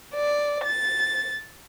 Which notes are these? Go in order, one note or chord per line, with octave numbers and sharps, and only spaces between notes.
D5
A6